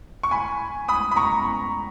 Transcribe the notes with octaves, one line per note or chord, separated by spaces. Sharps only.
C#6
G#5 B5
B5 D#6
B5
A#5 C#6